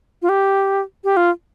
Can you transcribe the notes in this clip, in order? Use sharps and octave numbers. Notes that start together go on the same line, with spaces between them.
F4
G4
G4
F4